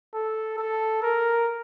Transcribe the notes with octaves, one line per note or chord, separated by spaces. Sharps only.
A4
A4
A#4